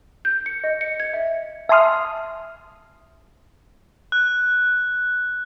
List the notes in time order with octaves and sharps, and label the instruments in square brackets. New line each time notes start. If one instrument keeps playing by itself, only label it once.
[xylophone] G6
C#7
D#5
C#7
G#6
E5
[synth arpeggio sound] E5 G#5 A5 C6 D#6 F6
[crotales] F#6